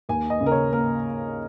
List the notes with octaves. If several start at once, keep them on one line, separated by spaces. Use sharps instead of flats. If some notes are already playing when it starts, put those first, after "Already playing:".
D#2 G#5
D#5
C#3
A#4
C#5
A#3 A#4